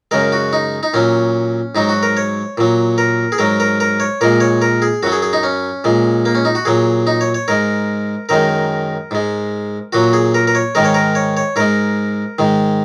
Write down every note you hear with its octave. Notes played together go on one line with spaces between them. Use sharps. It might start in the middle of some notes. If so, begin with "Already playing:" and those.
F#2 C#3 G#3 A#4
F#4
D#4
D#4
A#2 F#3 C#4
G#2 F#3 D#4
F#4
A#4
C#5
A#2 F#3
A#4
G#4
G#2 F#3 A#4
A#4
A#4
C#5
A#2 G#3 A#4
C#5
A#4
G#4
F#2 F#3 F#4
G#4
G#4
D#4
C#4
A#2 G#3
A#3
C#4
D#4
F#4
A#2 F#3 G#4
D#4
C#5
C#5
G#2 G#3 A#4
F#2 D#3 G#3 A#4
G#2 G#3
A#2 F#3 F#4
G#4
A#4
A#4
C#5
G#2 D#3 G#3 A#4
C#5
A#4
C#5
C#5
G#2 G#3 A#4
G#2 D#3 G#3